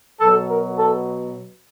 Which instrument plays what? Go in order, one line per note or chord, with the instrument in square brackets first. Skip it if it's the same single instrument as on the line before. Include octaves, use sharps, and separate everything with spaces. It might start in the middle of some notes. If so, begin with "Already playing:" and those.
[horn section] B2 F#3 A4
A#4
A4